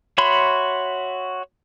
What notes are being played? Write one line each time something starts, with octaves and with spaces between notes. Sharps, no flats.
F#4 C#5 E5 B5 C6